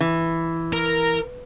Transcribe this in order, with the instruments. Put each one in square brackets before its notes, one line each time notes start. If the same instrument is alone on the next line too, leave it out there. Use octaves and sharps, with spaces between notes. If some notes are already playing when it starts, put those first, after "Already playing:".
[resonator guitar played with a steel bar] E3
[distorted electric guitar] A#4